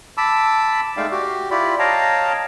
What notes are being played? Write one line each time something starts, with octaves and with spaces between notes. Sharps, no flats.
A5 B5 D6 E6
G#3 A3 D#4 D5 F5 G5
F#4 G4
E4 F4 G4 D5 B5
C#5 D#5 F5 G5 A5 A#5